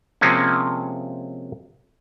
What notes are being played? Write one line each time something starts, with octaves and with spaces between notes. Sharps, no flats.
C3 F3 G#3 A#3 C4 C#4